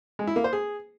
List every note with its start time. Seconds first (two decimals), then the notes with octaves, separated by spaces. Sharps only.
0.19 G#3
0.27 E4
0.36 A#3
0.44 C5
0.53 G#4